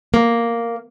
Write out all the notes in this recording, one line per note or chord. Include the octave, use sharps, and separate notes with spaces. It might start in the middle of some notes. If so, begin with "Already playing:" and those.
A#3